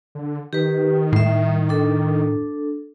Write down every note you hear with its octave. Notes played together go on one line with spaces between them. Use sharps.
D3
D#3 G4 B4
A2 G3 E5
D4 A4